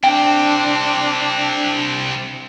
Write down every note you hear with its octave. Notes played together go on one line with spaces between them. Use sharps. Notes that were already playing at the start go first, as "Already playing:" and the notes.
C2 C4 D4 G5